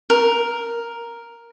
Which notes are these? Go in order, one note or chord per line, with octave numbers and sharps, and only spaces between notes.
A#4